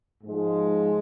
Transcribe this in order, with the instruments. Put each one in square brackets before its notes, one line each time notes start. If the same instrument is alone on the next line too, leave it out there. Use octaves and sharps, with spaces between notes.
[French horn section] G#2 F3 G#3